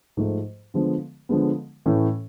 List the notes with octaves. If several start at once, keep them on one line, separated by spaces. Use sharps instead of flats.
G#2 F3 A3
D3 F3 G#3 B3
D3 F3 G#3 B3
A2 E3 A3 C#4